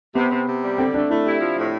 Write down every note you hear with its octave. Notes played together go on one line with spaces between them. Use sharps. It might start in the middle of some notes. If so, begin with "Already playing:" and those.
C3 B3
C3
C3
G3
D3 C4
A3 D4
A3 E4
E4 G4
F3
A2